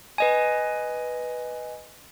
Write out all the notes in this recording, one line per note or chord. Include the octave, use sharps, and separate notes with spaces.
B4 D#5 G#5